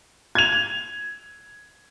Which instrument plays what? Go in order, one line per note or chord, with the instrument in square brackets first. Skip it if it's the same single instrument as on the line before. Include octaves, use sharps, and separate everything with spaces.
[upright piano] G#6 F7